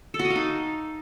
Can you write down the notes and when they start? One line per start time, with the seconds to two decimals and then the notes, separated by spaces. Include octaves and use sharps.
0.14 A4
0.19 F#4
0.25 D#5
0.30 F5
0.36 D#4